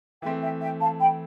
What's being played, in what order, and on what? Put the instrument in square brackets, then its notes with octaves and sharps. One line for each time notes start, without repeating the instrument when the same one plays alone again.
[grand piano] E3 A3 C4 [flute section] E5 G5
[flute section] E5 G5
E5 G5
F5 A5
G5 B5